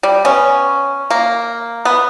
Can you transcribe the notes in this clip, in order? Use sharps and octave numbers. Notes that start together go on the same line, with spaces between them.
G3
B3 C#4
A#3
B3